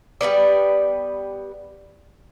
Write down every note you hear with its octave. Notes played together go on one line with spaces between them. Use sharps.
G3 B3 B4 D5